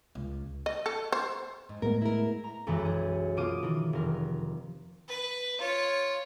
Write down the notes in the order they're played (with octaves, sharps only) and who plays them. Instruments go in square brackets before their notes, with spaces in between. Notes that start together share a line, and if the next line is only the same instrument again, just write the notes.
[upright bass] C#2
[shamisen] D#5
A4
C5
[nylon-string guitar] G#2
[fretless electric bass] A2 G#3 B3 [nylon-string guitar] A#4
[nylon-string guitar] E4 A#4
[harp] A#5
B1 F#2 E3 G#3 E4
G#4
B2 A#3 F4 D6 D#6 D#7
D#3 E3
F1 A#4
[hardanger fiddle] B4
F4 C#5